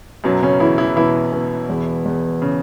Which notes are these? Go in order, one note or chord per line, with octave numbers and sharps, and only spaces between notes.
F#2 B2 F#3
C#3 C#4
E2 E3 E4
E3 E4
B2 E3 E4
B2
E2
E2
C#3